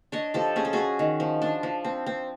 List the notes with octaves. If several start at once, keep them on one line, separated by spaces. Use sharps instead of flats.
D4 C#5 D#5
F3 G4 A4
C#4 G#4
A4
C#4 F#4 G#4
D#3
F3
D4
F3
C4
C4